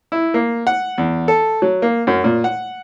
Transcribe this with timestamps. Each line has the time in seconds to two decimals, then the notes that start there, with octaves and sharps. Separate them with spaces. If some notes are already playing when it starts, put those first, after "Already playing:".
0.12 E4
0.34 A#3
0.67 F#5
0.98 E2
1.28 A4
1.62 F#3
1.82 A#3
2.07 F#2
2.24 A#2
2.44 F#5